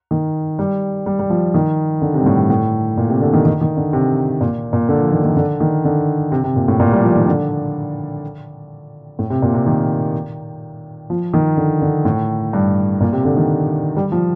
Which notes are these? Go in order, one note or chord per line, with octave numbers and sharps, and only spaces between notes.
D#3
G3
G3
G3
F3
D#3
D3
C3
G2
A2
G2
A2
A#2
C3
D3
D#3
D#3
D#3
D3
C3
A#2
A#2
D3
F3
D#3
D#3
D3
D#3
D3
C3
C3
A#2
A2
A#2
G3
F3
D#3
D3
A2
C3
A#2
C3
D#3
F3
D#3
D3
D3
A2
G2
A#2
C3
D3
D#3
G3
F3